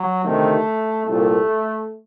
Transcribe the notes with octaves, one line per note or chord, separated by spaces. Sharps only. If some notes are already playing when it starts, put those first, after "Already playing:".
Already playing: F#3
D2 C3 D#3 A3
C2 A#2 A3